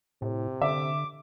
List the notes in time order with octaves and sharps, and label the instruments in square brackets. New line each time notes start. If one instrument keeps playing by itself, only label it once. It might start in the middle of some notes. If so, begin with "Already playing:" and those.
[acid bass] A2 [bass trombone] C3
[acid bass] D3 [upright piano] E5 [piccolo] D6